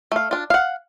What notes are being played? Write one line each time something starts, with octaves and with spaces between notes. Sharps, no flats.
A3 F5
D4 F4
F5 F#5